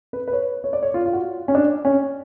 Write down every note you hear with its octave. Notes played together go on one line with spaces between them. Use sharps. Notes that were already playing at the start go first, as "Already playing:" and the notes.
B4
B4
C#5
C#5
D5
C#5
F4
F4
F#4
C#4
D4
C#4